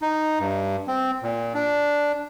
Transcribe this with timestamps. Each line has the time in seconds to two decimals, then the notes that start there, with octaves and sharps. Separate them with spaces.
0.02 D#4
0.40 G2
0.88 C4
1.23 A#2
1.54 D4